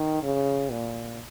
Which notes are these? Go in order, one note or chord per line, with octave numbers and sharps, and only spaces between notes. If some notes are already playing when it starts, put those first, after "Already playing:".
Already playing: D#3
C#3
A#2